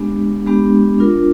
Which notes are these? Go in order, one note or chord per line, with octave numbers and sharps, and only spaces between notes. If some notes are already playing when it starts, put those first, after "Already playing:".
Already playing: G#3 B3 D4 G4
G#3 B3 D4 G4
D4 F4 A#4